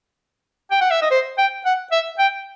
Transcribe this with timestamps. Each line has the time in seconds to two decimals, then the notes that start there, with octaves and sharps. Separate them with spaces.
0.71 G5
0.81 F#5
0.91 E5
1.02 D#5
1.11 C5
1.38 G5
1.66 F#5
1.92 E5
2.19 G5